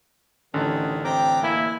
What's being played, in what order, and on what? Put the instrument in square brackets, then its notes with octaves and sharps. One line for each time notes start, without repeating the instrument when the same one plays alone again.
[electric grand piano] A1 D3 [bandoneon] D#3 [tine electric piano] C#4
[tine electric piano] C4 [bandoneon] G5 A#5 D6
[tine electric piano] A#3 [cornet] E4 [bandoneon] G#5